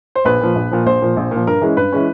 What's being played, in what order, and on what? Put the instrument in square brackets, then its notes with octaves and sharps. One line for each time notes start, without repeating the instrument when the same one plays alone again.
[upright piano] C5
A#1 B4
A#2 F3
A#1
A#2 F3
A#1 C5
A#2 F3
A#1
A#2 F3
G2 A#4
E3 G#3 C#4
G2 B4
E3 G#3 C#4